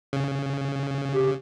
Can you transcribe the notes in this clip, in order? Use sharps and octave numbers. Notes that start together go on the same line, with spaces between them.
C#3
G4